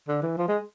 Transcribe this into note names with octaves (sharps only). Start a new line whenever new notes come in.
D3
E3
F3
G#3